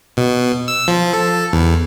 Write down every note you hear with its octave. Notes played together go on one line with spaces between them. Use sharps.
B2
E6
F3
A4
E2